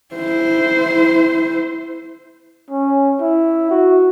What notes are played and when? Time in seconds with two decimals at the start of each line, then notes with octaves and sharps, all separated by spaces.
0.15 E4 C5
2.70 C#4
3.21 E4
3.70 F#4